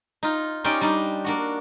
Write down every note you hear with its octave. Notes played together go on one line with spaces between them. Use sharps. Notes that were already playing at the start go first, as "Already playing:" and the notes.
D#4 F4
C#4 D#4 G4 C5 D5 G5
G3 D4 D#4
A#3 D4 F#4